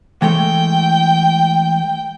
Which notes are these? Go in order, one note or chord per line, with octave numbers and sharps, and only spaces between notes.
E3 G#3 A3 G5